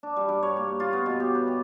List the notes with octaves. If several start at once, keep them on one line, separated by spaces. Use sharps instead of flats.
D4
G3
G2
C#5
A#3
F4
B3
B2
G4
B4
G4